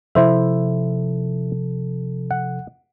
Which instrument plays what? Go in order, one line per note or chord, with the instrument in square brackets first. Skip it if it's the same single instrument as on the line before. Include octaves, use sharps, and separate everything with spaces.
[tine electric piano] C3 F3 A4 [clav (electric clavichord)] E4 C5 E5
[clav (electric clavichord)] F#5